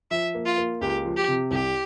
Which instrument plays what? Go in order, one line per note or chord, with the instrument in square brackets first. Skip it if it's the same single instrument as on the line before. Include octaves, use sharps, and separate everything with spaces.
[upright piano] F3 [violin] E5
[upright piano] A#3
[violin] F4
[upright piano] A#3
[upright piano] C#2 [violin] G4
[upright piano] F3
[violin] G4
[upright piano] C3
[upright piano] C2 [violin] G4